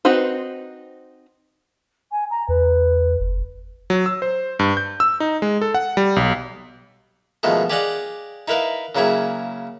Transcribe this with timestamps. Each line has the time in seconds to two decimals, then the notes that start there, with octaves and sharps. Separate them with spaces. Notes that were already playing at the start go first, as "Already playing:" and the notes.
0.05 C4 D#4 F#4 B4 C5
2.12 G#5
2.31 A#5
2.49 E2 B4
3.20 F#1
3.90 F#3
4.06 E6
4.22 C5
4.59 G2
4.77 G6
5.00 E6
5.20 D#4
5.42 G#3
5.61 A4
5.74 F#5
5.97 G3
6.16 B1
7.43 B2 D#3 F3 G#3 A3
7.70 G4 G#4 D5 D#5 F5 F#5
8.48 D#4 E4 A#4 B4 F5
8.95 C#3 F#3 A#3 E4 G#4